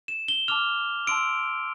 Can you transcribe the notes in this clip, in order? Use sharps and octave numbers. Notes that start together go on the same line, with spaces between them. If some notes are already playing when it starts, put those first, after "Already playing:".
E7
G7
A5 D6 F6 F7
A5 C6 E6 D7